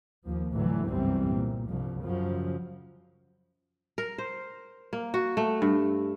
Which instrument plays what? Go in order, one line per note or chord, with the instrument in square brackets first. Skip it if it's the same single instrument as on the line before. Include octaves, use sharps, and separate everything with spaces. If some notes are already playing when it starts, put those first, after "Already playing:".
[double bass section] D#2 F3
F1 D2 A2 D3 E3 F#3
G1 C2 F#2 E3 G3 C4
A#2
C2 G2 F3
F#2 C#3 F3
[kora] A#4
C5
A#3
F#4
A3
G2